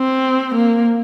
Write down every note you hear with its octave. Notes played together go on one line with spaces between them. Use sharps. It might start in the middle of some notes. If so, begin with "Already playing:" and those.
Already playing: C4
A#3